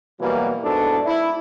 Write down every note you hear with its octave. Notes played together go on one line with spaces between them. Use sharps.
B2 E3 F#3 G3 A#3
G#2 B2 D4 E4 A4
E4